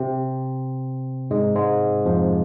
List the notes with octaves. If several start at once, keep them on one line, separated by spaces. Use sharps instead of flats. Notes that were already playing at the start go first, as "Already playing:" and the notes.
Already playing: C3 C4
G#2 G#3
G#2 G#3
F2 F3